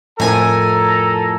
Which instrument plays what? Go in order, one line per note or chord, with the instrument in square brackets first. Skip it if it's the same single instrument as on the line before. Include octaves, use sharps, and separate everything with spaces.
[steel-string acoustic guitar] F2 A#4 [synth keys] A2 G#5 [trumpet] A4 [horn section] A#5